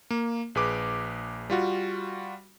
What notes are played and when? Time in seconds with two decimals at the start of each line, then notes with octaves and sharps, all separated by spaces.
0.10 A#3
0.55 A#1 G#4 B4 D6
1.50 G3 F4 F#4